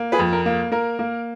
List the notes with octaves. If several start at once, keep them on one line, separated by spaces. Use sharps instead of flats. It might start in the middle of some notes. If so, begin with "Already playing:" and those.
Already playing: A#3
G#4 B4
F2
A#4
A#3
A#3 A#4
A#3